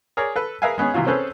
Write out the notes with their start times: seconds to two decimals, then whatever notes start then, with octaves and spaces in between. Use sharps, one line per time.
0.17 G#4 A#4 C#5 D5
0.36 A4 B4
0.62 G#4 A#4 B4 E5 F5 G#5
0.78 G#3 B3 C#4 G#4
0.94 C2 C3 E3 F4 F#4 F5
1.07 C4 C#4 G#4 A4 B4 C5